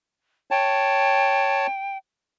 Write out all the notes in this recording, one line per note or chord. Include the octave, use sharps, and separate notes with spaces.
C#5 G5 A5